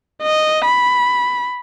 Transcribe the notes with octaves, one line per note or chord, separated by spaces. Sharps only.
D#5
B5